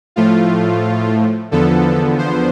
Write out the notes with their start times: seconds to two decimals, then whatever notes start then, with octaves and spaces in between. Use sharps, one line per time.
0.16 A2 F3 A3 F4
1.51 E2 D3 F3 B3 A4
2.18 C5